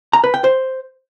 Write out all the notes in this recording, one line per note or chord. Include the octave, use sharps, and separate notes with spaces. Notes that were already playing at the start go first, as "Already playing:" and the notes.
A#5
B4
G5
C5